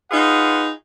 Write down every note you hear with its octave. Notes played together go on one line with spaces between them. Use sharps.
D#4 F4 G#4 B4 F#5